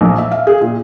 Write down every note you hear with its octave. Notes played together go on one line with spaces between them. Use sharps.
A#1
E5
F5
G#4
A#2